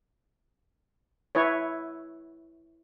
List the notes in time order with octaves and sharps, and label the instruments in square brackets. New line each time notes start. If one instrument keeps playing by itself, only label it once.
[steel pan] E4 B4 C#5